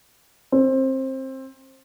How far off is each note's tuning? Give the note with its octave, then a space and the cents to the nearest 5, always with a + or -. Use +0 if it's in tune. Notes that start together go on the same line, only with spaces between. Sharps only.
C4 +20